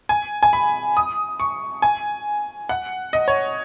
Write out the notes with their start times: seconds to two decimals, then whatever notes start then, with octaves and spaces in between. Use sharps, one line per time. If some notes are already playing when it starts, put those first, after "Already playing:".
0.09 G#5
0.43 G#5
0.53 B5
0.97 D#6
1.40 C#6
1.82 G#5
2.69 F#5
3.13 D#5
3.28 C#5